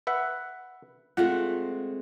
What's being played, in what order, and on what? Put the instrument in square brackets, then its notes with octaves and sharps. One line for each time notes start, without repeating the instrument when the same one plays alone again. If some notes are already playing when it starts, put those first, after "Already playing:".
[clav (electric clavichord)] B4 E5 F#5
[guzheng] G#3 A3 C4 [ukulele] F4 [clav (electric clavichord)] F#5